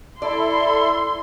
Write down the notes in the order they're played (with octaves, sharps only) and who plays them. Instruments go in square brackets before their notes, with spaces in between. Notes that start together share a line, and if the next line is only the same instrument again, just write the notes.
[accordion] E4 A4 [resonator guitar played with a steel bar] D5 [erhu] C6